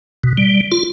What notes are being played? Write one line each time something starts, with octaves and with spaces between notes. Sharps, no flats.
B2
G3
F4